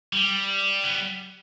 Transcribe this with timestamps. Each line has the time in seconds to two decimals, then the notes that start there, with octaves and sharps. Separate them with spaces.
0.13 G3
0.84 B3